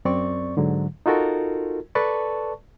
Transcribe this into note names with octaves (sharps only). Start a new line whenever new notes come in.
F#2 C4 D5 C#6
G#2 D3 F#3
D#4 F4 F#4 A4 A#4
A4 B4 D5 A5 C#6